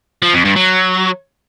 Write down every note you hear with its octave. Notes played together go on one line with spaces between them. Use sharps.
F3
F2
G2
F#3